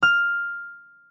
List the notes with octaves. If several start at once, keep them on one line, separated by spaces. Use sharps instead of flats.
F6